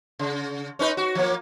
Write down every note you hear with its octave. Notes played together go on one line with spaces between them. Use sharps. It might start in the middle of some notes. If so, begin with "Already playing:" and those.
C#3
C#4 D#4 B4
F#4
F3 A#3